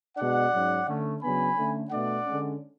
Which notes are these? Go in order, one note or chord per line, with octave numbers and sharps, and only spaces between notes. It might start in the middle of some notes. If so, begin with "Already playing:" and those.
B2 G#3 D4 D5 F#5
G#2 F#3 C#4
D3 A3 C#4
C#3 F#3 B3 D4 G#5 B5
D3 A3 C#4
B2 A3 D4 D5 F#5
D3 G#3 C#4